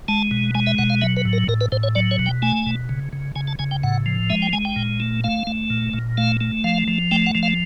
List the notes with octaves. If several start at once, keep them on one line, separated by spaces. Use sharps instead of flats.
G#3 A5
B2
G#3 G#5
E5
B2 F#5
F5
F#3 E5
B4
A2
A#4
A2 A#4
B4
A2 C5
C#5
F#3 D5
C#5
B2
G5
A3 G#5
B2
C#3
C#3
C#3 G#5
A5
C#3 G#5
G5
A2 F#5
F3
G#3 E5
G5
G#3 G#5
G5
A#2
A3
A3 F5
A3
A#2
A#2
A3 F5
A3
F3 F5
F3
A3 G5
F#5
F3
F5